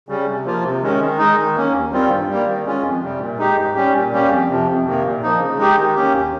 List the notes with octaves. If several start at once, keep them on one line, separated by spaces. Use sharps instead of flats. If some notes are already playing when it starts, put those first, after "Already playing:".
C#3 G3 C#4
C3
F3 A#3 F4
C3
D#3 G#3 C#4
D#3
G#3 D#4
D#3
A#3 C#4
D#2
D#3 G3 C4 F4
G2
G3
A#3
D#3
G#3 C#4 F4
F2
C3 G3
A#2
G#3 D#4 G4
G#2
G3 C#4 G4
A#2
G3 A#3 C#4 G4
F2
C3 F3
F2
C3 D#3 A#3
A#2
F3 A#3 D#4
C#3
G#3 D#4 G4
D#3
A#3 C#4 G4
D#2